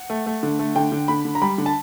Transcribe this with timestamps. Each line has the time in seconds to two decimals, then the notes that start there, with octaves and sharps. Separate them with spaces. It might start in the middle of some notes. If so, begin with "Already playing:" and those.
Already playing: F#5
0.10 A3
0.26 A3
0.43 D3
0.59 A3
0.76 D3 G5
0.92 D3
1.08 D3 B5
1.25 D3
1.35 A#5
1.42 G3 B5
1.58 D3
1.66 A5